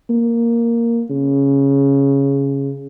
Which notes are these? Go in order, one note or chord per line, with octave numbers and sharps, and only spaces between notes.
A#3
C#3